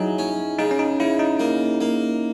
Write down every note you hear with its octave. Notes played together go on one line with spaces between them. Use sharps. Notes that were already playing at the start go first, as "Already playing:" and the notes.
Already playing: F#3 D#4 E4 G#4
C#4
C#3 D#4
C#4
D#4
C#3 E4
D#4
A#3
A#3